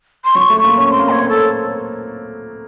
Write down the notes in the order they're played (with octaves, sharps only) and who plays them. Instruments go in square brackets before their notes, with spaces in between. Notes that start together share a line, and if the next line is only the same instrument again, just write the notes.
[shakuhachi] C6
[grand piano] F#3 [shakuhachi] C#6
[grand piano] A3
A#3
C#4
[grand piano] C4 [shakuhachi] C6
[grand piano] A#3
[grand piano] C4 [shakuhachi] C#5
[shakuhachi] A4